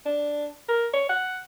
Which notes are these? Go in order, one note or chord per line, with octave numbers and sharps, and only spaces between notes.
D4
A#4
C#5
F#5